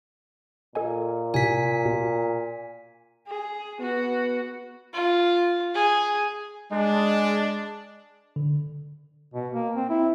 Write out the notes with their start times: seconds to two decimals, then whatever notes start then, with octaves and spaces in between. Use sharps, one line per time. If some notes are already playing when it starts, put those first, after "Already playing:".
0.75 A#2 A4 D#5 G#5
1.34 A2 C3 G#5 B6
1.86 B2
3.27 G#4
3.80 B3 F#4
4.93 F4
5.74 G#4
6.72 G#3 D4
8.36 D3
9.34 B2
9.53 A#3
9.76 C4
9.90 E4